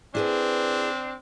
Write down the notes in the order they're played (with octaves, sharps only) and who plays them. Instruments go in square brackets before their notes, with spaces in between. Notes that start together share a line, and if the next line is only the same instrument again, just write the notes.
[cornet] C4 [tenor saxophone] D4 [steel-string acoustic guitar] E4 G#4 B4